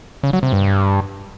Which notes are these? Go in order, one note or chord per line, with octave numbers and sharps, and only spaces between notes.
C#3
F#3
C3
G2